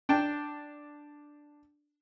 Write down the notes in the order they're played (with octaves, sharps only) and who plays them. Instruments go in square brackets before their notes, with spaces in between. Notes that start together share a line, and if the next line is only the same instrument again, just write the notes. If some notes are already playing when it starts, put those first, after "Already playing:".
[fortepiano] D4 G5 A5